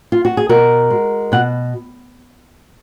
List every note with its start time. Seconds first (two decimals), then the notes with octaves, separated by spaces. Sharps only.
0.12 F4
0.25 F#4
0.37 G#4
0.49 B2 F#4 A#4
0.90 G#3
1.32 B2 F#5